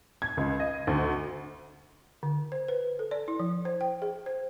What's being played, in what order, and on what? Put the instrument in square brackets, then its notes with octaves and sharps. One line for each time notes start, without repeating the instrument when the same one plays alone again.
[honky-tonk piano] G#6
C#2
D#5
D2
[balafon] D3
C5
B4
A4
D5
E4
F3
C5
G5
G#4
C5